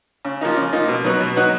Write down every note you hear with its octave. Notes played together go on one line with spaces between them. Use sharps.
C#3
F3 A#3 D#4
C#3
F3 A#3 D#4
B2
F#3 B3 D#4 F#4
B2
F#3 B3 D#4 F#4